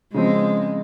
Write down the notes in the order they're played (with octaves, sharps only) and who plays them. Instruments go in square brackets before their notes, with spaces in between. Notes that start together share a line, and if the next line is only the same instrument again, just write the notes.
[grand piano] C#3 F3 C4 [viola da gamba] G#3